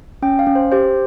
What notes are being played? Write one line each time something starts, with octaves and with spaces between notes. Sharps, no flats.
C#4 G5
F5
C#4
C5
G4 C5